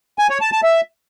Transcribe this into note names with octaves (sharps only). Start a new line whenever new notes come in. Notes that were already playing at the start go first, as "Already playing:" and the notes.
G#5
C#5
A5
A5
E5